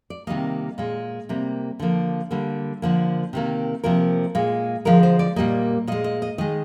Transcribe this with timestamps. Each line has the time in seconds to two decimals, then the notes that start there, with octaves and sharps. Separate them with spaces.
0.10 D5
0.27 C3 D#3 G3 A#3 D#5
0.78 A#2 G#3
1.29 C3 G3 A#3
1.79 D3 F3 A#3
2.31 D3 G3 A#3
2.82 D3 F3 A#3
3.33 C3 D#3 A#3
3.83 C3 F3 A#3 A#4
4.35 A#2 G#3
4.85 D3 F3 G#3 A#4
5.03 C5
5.19 D5
5.36 A#2 G3 A#3 D#5
5.87 A#2 G#3 D#5
6.04 D#5
6.22 D#5
6.38 D#3 G#3 D#5